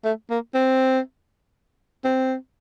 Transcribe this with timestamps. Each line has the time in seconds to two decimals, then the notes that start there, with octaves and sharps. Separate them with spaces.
0.05 A3
0.31 A#3
0.54 C4
2.05 C4